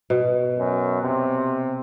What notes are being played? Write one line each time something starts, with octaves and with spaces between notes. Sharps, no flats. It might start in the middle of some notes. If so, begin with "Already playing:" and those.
B2
F#2
C3